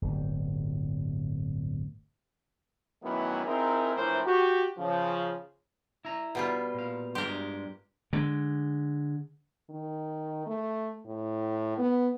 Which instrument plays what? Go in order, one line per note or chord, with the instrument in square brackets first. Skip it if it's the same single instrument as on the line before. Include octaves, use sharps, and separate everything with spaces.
[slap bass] D1 G1
[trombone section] F#2 D#3 E3 A3 B3 E4
C4 D#4 E4 G#4 A#4
A#1 A2 E3 E4 A#4 C5
F#4 G4
C#3 F3
[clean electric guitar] E4 A#5
[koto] B2 G3 F4
[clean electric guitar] A#2 F5
[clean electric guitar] G2 G#3 C6 [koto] G4 A#4
[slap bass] D3 G#3
[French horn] D#3
A3
A2
B3